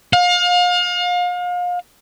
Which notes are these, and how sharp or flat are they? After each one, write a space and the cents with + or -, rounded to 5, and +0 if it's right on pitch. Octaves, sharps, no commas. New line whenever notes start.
F5 +35